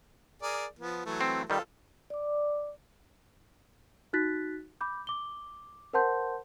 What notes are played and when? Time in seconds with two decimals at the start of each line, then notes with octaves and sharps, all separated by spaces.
0.42 G#4 A#4 D5
0.79 F3 B3
1.06 E3 F#3 A3
1.21 C4
1.50 D#3 G3 F4 A4
2.10 D5 D6
4.13 D#4 F#4 F#6 A6 B6
4.81 B5 D6 G6
5.07 D6 G7
5.93 A#4 C5 F#5 A5 C6 G6